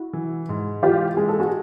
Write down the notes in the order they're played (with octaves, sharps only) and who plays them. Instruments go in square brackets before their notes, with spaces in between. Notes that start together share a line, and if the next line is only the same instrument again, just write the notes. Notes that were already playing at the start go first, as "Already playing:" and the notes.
Already playing: [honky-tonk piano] E4 F#4
[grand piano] E3
G#2
[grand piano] E3 [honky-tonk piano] F4 G4
[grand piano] G#3 [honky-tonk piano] G#4
[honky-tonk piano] A4
F#4 G#4